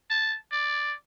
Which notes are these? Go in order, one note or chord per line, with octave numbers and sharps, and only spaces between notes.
A5
D5